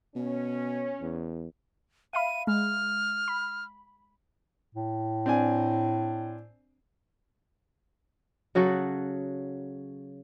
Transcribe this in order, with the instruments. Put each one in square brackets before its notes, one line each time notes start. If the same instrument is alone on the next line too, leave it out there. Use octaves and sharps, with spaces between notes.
[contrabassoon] B2 [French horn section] C#4
[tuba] E2
[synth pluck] E5 F5 B5 [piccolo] D#7
[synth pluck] G#3 [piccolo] F6
[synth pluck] B5
[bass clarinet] A2
[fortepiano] C4 D4 G#5
[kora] C#3 F#3 F#4 A4